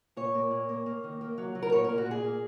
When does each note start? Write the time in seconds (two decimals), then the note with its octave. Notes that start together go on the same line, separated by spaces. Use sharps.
0.17 A#2 C#5
0.34 A#3
0.51 A#2
0.69 A#3
0.86 A#3
1.04 D#3
1.21 A#3
1.38 F#3
1.55 F#3
1.62 A#4
1.72 A#2 C#5
1.84 A#2 A#4
1.98 F#4
2.06 A#2 G#4
2.24 A#3